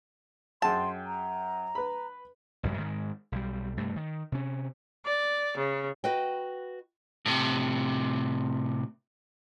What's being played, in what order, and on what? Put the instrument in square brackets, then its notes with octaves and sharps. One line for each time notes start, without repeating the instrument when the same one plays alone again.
[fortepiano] F#2 G#4 G5 [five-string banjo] A5 [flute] C6
[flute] A#5
[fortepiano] B4 B5
[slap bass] A1 F#2 C3 G#3
G#2 D#3 F3 G#3
B1 G3
G2 C3 A3
D#3
C3 C#4
[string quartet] D5
C#3
[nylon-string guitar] F#4 B4 D#5 G5
[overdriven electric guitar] A2 C3